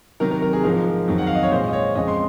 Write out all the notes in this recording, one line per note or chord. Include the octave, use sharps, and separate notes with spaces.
C3 D#3 F#3 A#4
A#4
A#4
G#4
G#2 F3 G#3 A#4
F2 D#3 F#3
F#5
F5
D#5
C#5
A#2 G#3 C5
D#5
C#5
F2 C#3 G#3 D#5
C6